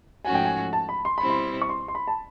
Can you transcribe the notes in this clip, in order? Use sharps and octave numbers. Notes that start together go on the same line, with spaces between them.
G#2 F3 A3 C#4 F#4 G#5
G5
G#5
A5
B5
C6
B2 G3 C4 E4 B5
C6
C#6
C6
C6
B5
A5